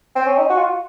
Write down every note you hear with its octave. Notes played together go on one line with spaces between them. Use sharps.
C4
C#4
D#4
F#4
F4